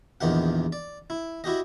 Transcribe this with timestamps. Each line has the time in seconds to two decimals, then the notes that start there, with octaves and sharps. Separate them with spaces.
0.21 A#1 E2 D#3 G4 F#5
0.72 D5
1.10 E4
1.44 E4 F#4 G4 D#5